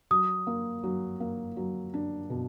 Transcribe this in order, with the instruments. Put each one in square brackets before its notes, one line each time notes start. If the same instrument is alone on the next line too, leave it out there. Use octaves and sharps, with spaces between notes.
[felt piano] F#3 [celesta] D#6
[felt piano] A#3
F#3
A#3
F#3
D4
B2